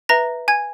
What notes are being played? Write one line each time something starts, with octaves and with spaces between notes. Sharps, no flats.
B4 E5 A#5 A#6
G#5 G#6